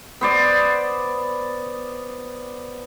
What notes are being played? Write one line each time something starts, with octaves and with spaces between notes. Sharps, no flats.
B3 C5 D5